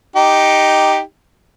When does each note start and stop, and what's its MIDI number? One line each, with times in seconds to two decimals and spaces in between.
0.16 1.00 63
0.16 1.00 67